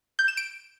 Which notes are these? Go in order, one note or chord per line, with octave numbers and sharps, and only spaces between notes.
G6
E7
D7